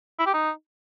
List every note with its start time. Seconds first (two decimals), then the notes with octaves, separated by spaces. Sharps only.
0.19 E4
0.26 G4
0.34 D#4